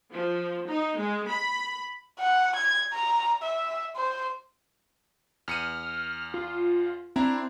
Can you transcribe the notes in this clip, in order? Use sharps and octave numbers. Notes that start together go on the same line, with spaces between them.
F3
D#4
G#3
B5
F#5
G#6
A#5
E5
C5
E2 F6 C#7 D#7
F4
C4 D4 E4 A#5